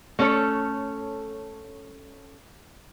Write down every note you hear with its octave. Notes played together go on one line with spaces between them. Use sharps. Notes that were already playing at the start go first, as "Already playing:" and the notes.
A3 C#4 A4 C#5